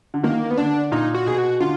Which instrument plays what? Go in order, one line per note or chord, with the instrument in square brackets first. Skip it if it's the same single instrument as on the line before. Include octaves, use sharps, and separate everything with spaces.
[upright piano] D3
[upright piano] D#3 [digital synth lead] A#3
[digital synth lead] B3
[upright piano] D3 [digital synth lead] D4
[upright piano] A#2 [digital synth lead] D#4
[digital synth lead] F#4
[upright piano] B2 [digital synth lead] G#4
[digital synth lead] F#4
[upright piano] D3 [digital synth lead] F4